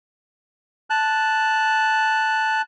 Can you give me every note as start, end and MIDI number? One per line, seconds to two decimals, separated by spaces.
0.90 2.62 81
0.90 2.62 90